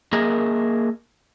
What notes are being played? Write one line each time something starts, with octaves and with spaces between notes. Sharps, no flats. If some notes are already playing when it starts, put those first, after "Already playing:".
A#3 G#4 A#4 D#5 E5